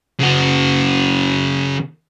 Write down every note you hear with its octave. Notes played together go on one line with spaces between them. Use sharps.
C#3 F#4